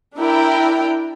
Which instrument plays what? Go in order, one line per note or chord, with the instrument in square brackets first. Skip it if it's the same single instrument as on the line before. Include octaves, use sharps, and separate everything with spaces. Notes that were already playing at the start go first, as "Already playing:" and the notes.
[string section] D4 E4 A#4 G5